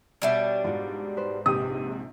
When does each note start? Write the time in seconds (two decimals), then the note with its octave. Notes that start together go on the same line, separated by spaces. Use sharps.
0.22 B2 G3 D4 C#5 E5 G5
0.64 G#2 F4 F#4
1.17 B4 C5
1.46 A#1 G#2 C3 G4 D#6